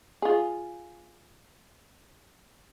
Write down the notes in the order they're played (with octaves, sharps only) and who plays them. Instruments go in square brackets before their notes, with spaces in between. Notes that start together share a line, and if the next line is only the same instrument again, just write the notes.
[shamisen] F4 G#4